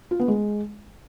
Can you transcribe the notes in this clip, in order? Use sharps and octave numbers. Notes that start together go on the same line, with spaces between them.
F4
B3
G#3